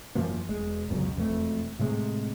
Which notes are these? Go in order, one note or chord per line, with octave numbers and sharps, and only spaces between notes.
F#2 E3 F3 A#3
E1 G#3
D1 C#2 F#2 B2
E1 F2 C#3 A3
A2 C3 G#3